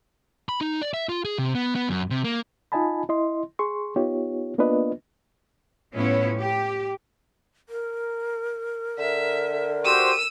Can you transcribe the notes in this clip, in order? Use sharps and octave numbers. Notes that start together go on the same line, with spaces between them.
B5
D#4
D5
E5
F4
G#4
C3
B3
B3
F#2
C3
A#3
D#4 F4 D#5 G#5 A5 B5
E4 D#5 C6
G#4 C6 C#6
B3 D#4 F4 G4 C#5
A#3 B3 D4 F4 B4 D#5
A2 F3 B3 C#4 E4 C#5
G4
A#4
D3 E5
F#4 G4 C5 E6 D#7